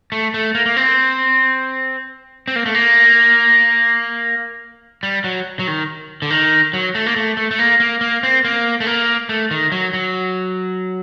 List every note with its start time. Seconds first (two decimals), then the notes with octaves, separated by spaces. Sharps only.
0.12 A3
0.34 A3
0.55 A#3
0.66 A#3
0.76 C4
2.48 C4
2.56 A#3
2.66 A3
2.74 A#3
5.03 G3
5.24 F#3
5.59 F#3
5.67 D#3
6.22 D3
6.30 D#3
6.73 F#3
6.95 A3
7.06 A#3
7.16 A3
7.37 A3
7.51 A3
7.59 A#3
7.80 A#3
8.01 A#3
8.23 C4
8.44 A#3
8.80 A3
8.86 A#3
9.29 A3
9.51 D#3
9.72 F#3
9.93 F#3